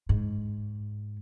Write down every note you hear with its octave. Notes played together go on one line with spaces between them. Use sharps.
G#2